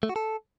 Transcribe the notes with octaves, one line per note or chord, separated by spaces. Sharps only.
A3
F#4
A4